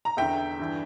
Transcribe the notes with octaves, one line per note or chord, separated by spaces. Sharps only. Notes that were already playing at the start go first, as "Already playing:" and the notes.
A#5
E2 D3 E5 G5
G2 E3